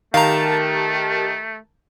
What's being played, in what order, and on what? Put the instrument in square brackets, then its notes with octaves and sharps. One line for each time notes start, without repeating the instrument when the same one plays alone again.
[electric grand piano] D#3 [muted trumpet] A3 [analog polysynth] G4 A#4 A5 [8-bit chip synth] F5 A#5